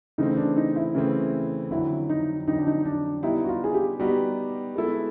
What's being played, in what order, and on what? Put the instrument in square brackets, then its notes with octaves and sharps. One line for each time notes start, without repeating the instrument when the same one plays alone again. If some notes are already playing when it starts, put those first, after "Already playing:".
[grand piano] C#3 E3 A3 C4 [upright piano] D#4
[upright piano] D4
D#4
E4
[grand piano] C#3 E3 A3 C4
[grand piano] F2 D3 F#3 [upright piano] E4
[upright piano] D#4
[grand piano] F2 D3 F#3 [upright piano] D#4
[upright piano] D4
D#4
D4
[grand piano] G3 B3 D#4 G4 [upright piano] E4
[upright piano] F#4
F4
G#4
G4
[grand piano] G3 B3 D#4 G4 [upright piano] F#4
[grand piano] G#3 B3 E4 A4